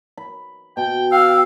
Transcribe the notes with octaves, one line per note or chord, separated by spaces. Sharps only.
B5
B2 G5
F5 G5 E6